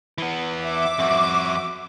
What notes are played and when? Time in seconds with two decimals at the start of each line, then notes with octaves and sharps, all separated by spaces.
0.18 E3 B3
0.62 E5 D6
0.99 F2 F#4